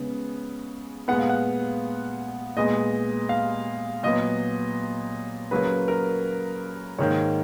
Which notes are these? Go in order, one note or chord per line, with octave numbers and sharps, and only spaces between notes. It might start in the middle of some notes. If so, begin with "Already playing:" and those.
Already playing: C#3 G#3 B3
A#2 G#3 B3 F#5
F5
F#5
A#2 G#3 B3 D#5
F5
A#2 F#3 B3 D#5
C#3 F#3 A#3 B4
A#4
G#2 D#3 A#3 C#5